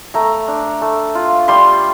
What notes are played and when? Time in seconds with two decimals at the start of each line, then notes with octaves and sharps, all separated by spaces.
0.14 A3 A#5
0.48 D4
0.82 A3
1.15 F4
1.48 G3 C6